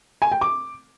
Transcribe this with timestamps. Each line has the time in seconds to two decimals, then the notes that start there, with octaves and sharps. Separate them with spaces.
0.22 G#5
0.32 G5
0.41 D6